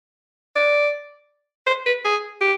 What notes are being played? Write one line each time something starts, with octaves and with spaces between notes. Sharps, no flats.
D5
C5
B4
G#4
G4